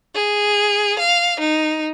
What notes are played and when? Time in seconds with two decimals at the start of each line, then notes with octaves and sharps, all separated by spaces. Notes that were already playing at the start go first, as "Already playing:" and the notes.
0.15 G#4
0.99 F5
1.40 D#4